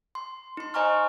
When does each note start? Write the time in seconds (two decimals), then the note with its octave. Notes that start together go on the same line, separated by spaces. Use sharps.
0.15 C6
0.57 D#4 C6
0.74 C5 D#5 G#5 A#5 C#6 F6